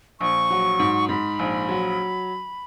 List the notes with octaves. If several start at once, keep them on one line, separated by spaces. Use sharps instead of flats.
A#1 C#6
F#3
G#2
G#2 B5
A#1
F#3